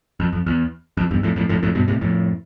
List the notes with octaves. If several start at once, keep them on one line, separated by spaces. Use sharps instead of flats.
F2
F2
E2
F2
E2 G2
F2 A2
F2 A2
F2 A2
F2 A2
G2 B2
A2 C3
F2 A2